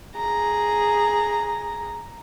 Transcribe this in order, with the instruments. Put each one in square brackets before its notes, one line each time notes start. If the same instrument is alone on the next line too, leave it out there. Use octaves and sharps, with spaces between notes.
[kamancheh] G#4 A#5